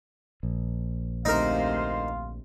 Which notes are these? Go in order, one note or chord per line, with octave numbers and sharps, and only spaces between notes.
A#1
D2 C3 D#4 F4 A#4 C5 F5